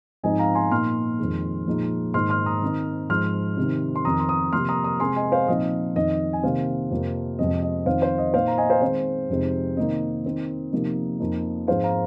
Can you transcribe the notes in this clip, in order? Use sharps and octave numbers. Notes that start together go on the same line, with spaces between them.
G#2 F3 G#3 C4 D#4 D#5 G#5
F5 A#5
G#5 C6
A#2 F3 A#3 D#4 C6 F6
F2 D#3 G#3
A#2 F3 G#3 D#4
G#2 D#3 A#3 D#4 C6 F6
C6 F6
A#5 D#6
D#3 C4 D#4
G#2 F3 G#3 C6 F6
C3 D#3 C4 D#4
C6
F2 D#3 C4 D#4 A#5 D#6
C6
A#5 D#6
C3 F3 A#3 C6 F6
A#5 D#6
A#5 D#6
C3 G#3 C4 G#5 C6
D#5 G#5
C5 F5
A#2 F3 C4 D#4 D#5
F2 D#3 C4 D#4 D#5
G#5
C3 D#3 A#3 C5 F5
F2 C3 F3 A#3
F2 C3 F3 G#3 C4 D#5
D#5
F2 D#3 C4 D#4 C5 F5
C5
D#5
A#2 A#3 D#4 C5 F5
A#5
D#5 G#5
C5 F5
D#3 G#3 C4 C5
F2 C3 G#3 C4 D#4
C3 D#3 A#3 D#4 D#5
D#3 C4 D#4
C3 F3 A#3 D#4
F2 F3 A#3 D#4
G#2 F3 G#3 C4 D#4 C5 F5
F5 A#5